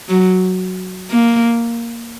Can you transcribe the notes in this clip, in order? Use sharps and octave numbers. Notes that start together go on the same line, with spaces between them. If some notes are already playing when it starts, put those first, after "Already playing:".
F#3
A#3